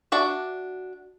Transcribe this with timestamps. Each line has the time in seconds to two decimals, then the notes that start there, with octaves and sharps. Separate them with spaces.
0.12 D4 F#4 E5